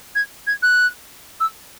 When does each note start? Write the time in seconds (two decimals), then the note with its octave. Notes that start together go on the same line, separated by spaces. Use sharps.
0.15 G#6
0.47 G#6
0.62 F#6
1.40 E6